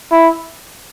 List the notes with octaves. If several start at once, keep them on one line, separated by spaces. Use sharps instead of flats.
E4